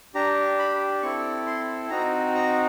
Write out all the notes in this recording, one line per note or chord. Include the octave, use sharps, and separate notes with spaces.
D4 G4 A#5
B5
C4 E4 A4 C#6
C6
C4 D#4 F#4 A#5
A#5